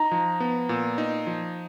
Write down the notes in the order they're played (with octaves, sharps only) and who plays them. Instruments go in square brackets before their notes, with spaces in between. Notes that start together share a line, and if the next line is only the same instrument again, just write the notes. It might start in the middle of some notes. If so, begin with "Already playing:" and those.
Already playing: [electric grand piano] D#4 [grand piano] A#5
[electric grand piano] F3
B3
A#2
D#4
F3